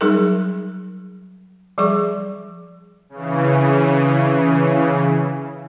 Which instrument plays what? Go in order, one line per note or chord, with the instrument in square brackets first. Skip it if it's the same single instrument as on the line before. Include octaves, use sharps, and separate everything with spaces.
[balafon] F#3 G3 D#4 G#4 A#4
F3 G3 G#4 C#6
[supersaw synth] C#3 E3